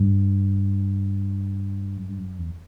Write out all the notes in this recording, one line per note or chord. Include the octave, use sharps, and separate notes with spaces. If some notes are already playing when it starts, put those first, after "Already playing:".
Already playing: G2
F#2
G2
F#2
E2